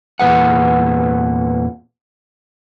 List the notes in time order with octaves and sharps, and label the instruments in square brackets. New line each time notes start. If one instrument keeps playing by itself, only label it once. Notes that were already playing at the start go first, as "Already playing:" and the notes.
[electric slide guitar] E2 A#2 F3 B4 F#5